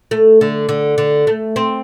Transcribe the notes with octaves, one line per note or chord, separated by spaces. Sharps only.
A3
D3
D3
D3
A3
C4